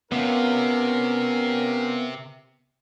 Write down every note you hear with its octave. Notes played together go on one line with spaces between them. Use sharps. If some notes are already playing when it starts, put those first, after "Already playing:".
C3 B3 C#4 F4 A#4